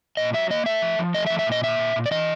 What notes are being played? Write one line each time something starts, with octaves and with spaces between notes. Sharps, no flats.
A#2 D#5
F#3 E5
A#3 D#5
A3 E5
F3
F3
A3 D#5
E5
F3
E5
A#2
D#5
A#3 E5
A#2
A#2
D5
E3 D#5